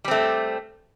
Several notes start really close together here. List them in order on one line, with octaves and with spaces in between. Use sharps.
G3 C4 A3